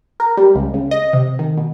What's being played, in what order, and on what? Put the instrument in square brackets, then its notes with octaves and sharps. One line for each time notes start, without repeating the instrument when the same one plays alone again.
[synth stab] A#4
G3
C#2
C#3
D#5
C3
D#3
B2